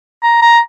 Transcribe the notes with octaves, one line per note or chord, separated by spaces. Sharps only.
A#5
A#5